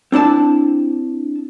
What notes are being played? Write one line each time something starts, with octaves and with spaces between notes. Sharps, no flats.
C4 D4 E4 A5